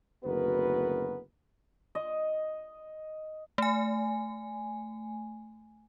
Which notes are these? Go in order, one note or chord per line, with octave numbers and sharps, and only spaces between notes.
F#1 D2 B3 F#4 A#4 B4
D#5
A3 G#5